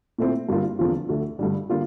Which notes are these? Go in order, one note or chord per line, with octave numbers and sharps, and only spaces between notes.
A#2 A3 C4 E4
G2 D3 G3 A#3 F4
E2 D3 F3 C4 F4
D2 D3 A3
G2 D3 G3
D3 G3 A#3 F4